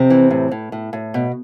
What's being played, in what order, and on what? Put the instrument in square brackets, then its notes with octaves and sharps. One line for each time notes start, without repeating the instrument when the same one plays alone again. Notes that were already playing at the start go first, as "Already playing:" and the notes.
Already playing: [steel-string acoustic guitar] F2 C3 C4
E3
A2
A2
A2
A2
B2